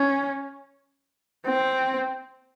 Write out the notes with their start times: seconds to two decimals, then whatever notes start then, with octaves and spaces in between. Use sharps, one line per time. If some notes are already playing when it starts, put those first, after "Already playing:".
Already playing: C#4
1.46 C4